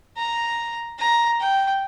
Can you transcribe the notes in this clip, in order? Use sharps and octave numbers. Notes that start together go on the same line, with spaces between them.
A#5
A#5
G5